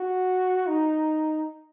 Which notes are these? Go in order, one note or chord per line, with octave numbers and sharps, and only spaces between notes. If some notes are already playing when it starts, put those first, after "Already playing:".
Already playing: F#4
D#4